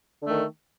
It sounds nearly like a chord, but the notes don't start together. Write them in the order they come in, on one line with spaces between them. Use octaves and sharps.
D3 A3 D#3